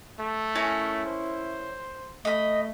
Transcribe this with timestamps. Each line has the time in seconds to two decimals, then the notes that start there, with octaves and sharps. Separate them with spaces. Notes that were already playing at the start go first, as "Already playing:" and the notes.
0.19 A3
0.55 C#4 E4 A#4
1.06 C5
2.25 A3 D#5 B5